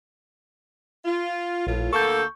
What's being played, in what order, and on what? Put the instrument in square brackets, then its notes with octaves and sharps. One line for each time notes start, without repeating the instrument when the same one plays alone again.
[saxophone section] F4
[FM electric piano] A#1 [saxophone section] A2 F4
[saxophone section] D2 A#3 A4 [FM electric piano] C#6 G6